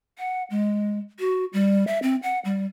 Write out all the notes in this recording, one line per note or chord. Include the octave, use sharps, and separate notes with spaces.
F#5
G#3
F#4
G3
E5
C4
F#5
G3